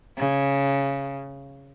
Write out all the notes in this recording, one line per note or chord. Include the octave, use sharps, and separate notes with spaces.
C#3